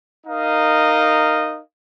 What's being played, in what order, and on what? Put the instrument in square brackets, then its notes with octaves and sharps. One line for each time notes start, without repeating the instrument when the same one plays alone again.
[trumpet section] D#4 A#4 D#5 F5